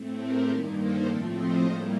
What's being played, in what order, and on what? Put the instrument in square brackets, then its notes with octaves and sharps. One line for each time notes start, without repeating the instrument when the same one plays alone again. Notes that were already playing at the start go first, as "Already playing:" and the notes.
Already playing: [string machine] A2 A3 C4
G4 A#4
G2 D#3 A#3 A4 C5
A4 C5
A2 F3 A3 C4 A#4 D5
C5 D#5
A2 G3 A#3 C5 D#5